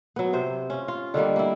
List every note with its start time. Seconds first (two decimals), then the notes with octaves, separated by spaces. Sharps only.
0.16 F#3 B3
0.33 C3 C5
0.70 C#4 F4
0.88 F4
1.14 D3 D#3 G3 A#3
1.36 A#3 E4